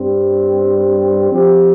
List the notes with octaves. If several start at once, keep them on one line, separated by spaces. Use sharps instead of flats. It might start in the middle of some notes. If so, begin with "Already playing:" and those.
Already playing: G2 G3 C4
F3 C4 G4